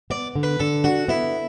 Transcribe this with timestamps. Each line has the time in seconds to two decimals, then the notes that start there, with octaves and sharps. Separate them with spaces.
0.10 B3 D5
0.35 D3
0.43 B4
0.60 D3 A4
0.84 D4 F#4
1.08 B3 E4